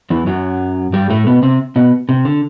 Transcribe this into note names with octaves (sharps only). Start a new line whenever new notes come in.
E2 E3
F#2 F#3
G2 G3
A2 A3
B2 B3
C3 C4
B2 B3
C3
D3